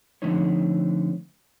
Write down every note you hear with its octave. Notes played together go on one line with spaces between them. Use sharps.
D3 F3 A3 C4 D#4 C#5